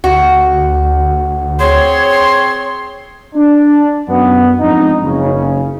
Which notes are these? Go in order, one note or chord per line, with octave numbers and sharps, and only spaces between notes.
D2 F#4
C4 G#4 C#5 C6
D4
F#2 B3
G#2 F3 C4 D4 D#4
F#1 C#3